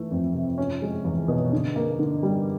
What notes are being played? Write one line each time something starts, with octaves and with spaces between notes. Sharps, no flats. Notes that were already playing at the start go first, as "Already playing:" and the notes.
Already playing: E3 A3
F2
C3
C#4
G#3
E2
B2
D3
A#3
D3
G3